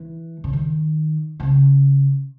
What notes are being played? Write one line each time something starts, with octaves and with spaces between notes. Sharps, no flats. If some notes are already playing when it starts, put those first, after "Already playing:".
Already playing: E3
C#3
D#3
B2
C#3